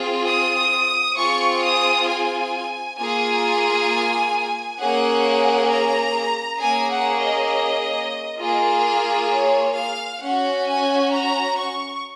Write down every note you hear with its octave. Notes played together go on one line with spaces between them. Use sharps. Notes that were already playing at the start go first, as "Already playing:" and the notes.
Already playing: C4 F4 G#4
D#6
C4 F4 G#4 C#6
D#6
G#5
A#3 F4 G#4 G#5
A#3 C#4 G#4 F#5
A#5
A#3 C#4 G#4 G#5
F#5
D#5
A#3 F4 G#4
C#5
F5
C#4 F#5
F#4
G#5
A#5
C#6